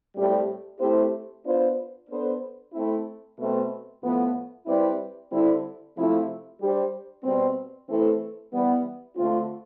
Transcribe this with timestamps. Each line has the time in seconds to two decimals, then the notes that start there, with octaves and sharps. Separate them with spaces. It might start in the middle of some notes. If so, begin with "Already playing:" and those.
0.15 A2 G3 C4 G4
0.80 A3 C4 E4 G4 C5
1.44 B3 D4 F4 C5
2.09 B3 D4 A4 C5
2.73 A3 C4 E4
3.37 B2 A3 C4
4.02 A2 F3 B3
4.66 G3 C4 E4 B4 D5
5.31 D3 G3 C4 E4
5.95 C3 F3 A3 C4 E4
6.58 G3 D4 G4 C5
7.24 B2 G3 C4
7.88 E3 A3 C4 E4 A4
8.52 E3 G3 B3
9.16 D3 A3 C4 F4